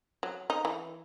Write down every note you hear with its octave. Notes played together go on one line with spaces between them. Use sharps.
F#3
D#4
E3